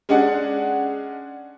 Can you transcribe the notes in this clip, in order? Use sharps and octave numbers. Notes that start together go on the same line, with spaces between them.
G#3 C#4 D4 G#4 D5 F#5